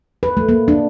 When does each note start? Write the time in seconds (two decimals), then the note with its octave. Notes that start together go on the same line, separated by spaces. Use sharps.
0.23 B4
0.37 A3
0.49 A#3
0.68 D4